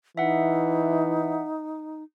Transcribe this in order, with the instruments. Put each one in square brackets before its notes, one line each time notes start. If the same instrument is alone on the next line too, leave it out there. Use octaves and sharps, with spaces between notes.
[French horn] E3 [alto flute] D#4 [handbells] E5 F#5